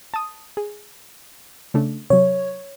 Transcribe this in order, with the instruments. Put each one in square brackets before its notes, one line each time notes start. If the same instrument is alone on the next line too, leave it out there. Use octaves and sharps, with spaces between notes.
[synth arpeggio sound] A5 D#6
G#4
C#3 A3 D4
[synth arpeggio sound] C3 F#3 [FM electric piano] C#5